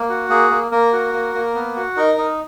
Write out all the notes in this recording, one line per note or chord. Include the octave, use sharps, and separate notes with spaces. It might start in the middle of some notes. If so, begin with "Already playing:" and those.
Already playing: A#3
F#4
A#3 G#4
A#3
A#3 A#4
F#4
A#3
A#3
B3
F#4
D#4 A#4
D#4